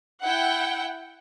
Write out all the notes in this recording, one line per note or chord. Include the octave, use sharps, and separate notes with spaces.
E4 F#5 G5